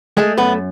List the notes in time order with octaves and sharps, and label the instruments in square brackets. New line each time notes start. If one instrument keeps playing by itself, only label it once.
[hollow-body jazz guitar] G#3 A3 G#4
F#2 B3 B4